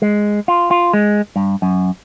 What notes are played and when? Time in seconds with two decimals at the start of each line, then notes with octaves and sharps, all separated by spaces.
0.02 G#3
0.48 F4
0.71 F4
0.93 G#3
1.36 G2
1.62 F#2